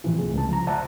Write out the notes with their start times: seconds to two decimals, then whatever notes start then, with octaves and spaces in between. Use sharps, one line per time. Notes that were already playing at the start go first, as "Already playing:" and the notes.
0.04 A2 C3 E3 F3
0.18 C#2 A3 G#4
0.34 C#2 A5
0.49 F3 A#5
0.67 C5 D5 E5 F#5 A5 A#5